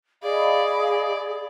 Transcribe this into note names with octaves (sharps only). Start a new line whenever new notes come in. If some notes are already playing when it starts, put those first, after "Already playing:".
G#4 D5 D#5 F5 B5